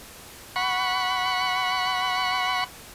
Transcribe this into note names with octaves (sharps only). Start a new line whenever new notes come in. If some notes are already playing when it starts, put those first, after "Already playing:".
F#5 B5 C#6